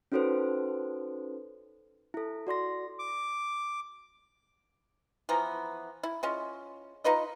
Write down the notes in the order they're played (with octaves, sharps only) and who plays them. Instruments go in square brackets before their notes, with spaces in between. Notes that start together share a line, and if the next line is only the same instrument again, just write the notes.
[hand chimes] C#4 D#4 F#4 A4 B4 C5
E4 A4
F#4 D5 C6 A#6
[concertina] D6
[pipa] E3 F3 B3 A#5
E4
G#3 C#4 F4
D#4 F4 B4 D#5